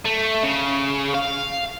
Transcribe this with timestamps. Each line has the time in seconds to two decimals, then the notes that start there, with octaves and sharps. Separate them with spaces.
0.05 A3
0.43 C#3
1.14 F5